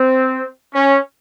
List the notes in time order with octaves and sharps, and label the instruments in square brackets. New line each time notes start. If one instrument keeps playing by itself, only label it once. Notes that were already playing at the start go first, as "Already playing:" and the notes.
Already playing: [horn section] C4
C#4